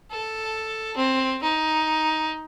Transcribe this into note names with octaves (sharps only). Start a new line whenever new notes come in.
A4
C4
D#4